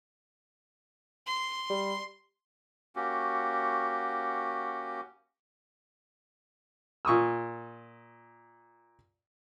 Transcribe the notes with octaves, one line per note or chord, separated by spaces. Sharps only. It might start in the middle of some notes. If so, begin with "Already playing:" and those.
C6
G3
A#3 C#4 F#4 G4
A#2 C#6 D#6 E6